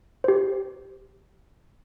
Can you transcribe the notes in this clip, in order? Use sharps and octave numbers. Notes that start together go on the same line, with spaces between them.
G4 C5